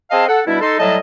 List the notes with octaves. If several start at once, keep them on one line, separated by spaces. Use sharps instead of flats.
C4 G#4 C5 D#5 F5 A5
A4 F#5
B2 G3 D4 E4
D#4 A4 C6
A2 F#3 G3 D#5 A5